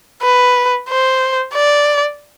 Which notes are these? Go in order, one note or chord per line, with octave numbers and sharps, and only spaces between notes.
B4
C5
D5